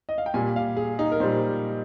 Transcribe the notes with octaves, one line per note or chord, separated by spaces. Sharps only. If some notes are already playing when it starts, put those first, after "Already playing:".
D#5
F5
G5
A#2 G3 G#5
F5
G#4
D#4
A#4
A#2 G3 C5